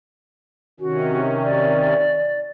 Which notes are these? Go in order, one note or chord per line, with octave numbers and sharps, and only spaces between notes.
C3 D#3 C#4 F#4
D5